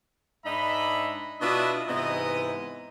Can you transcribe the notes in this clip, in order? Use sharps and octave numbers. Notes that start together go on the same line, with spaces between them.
G#2 D4 D#4 D#5 E5 B5
B2 D4 E4 F4 D#5 E5
G#2 C3 E3 B3 D#5